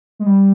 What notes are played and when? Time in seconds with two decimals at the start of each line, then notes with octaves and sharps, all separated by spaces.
0.19 G#3
0.26 G3